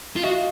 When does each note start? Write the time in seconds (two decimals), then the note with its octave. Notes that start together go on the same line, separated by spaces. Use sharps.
0.16 F4
0.23 F#4 D#5 F5